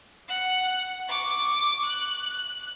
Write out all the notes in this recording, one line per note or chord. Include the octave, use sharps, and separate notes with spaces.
F#5
C#6 D6
F#6